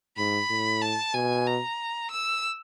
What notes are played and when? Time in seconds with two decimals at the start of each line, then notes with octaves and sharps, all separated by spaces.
0.17 G#2 B5
0.50 A2
0.82 A5
1.14 B2 G#5
1.47 A#5
2.11 E6